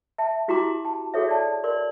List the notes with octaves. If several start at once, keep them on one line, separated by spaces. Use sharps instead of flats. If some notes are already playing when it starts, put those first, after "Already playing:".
E5 A5
E4 F#4 G4 A#5 C6 D6
A5
F#4 G#4 A4 C#5 E5
D5 A5
A#4 D5 C6